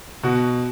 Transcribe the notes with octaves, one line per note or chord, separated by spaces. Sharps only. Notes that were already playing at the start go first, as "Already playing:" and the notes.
B2 F#4